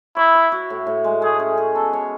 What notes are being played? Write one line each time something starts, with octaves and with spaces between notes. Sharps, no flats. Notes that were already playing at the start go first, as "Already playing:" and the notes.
E4 C#5
C#5
F#4
A2
A2
G#3
A3 G#4
C#4
G#4
B3 A4
C#5